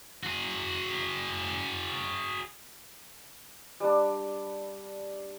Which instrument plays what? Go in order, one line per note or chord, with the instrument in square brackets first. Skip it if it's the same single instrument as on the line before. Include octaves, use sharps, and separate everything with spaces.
[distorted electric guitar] F#4 G#4
[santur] G3 D4